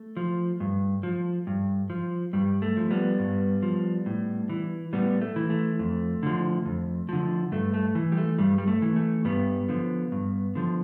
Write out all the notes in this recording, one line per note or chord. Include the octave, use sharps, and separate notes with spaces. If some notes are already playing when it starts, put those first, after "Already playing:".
Already playing: A3
F3
G2
F3
G2
F3
G2 G3
A3
F3
G3 B3
G2
F3
A2
E3
A2 G3 B3
A3
E3
A3
F2
D3 F3
F2
D3 F3
G2 A3
A3
E3
G3
A3
G2 G3
G3
A3
E3
A3
G2 G3 B3
D3 F3
G2
D3 F3